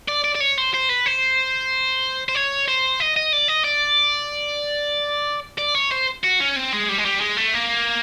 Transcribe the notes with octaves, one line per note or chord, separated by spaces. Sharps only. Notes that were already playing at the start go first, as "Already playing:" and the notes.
D5
D5
D5
C#5
C5
C5
B4
C5
C5
C#5
C5
D#5
D#5
D5
D#5
D5
D5
C#5
C5
F#4
C#4
C4
G#3
G3
G#3
G3
G#3
A3
A#3